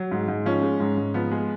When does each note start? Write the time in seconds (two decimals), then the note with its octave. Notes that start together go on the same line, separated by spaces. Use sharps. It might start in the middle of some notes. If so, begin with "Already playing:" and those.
Already playing: F#3
0.11 G#2
0.28 G#2
0.46 F3 C#4
0.63 G#3
0.80 G#2
0.97 G#2
1.14 F3 B3
1.31 G#3